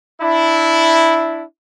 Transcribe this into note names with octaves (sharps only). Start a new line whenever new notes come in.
D4 E4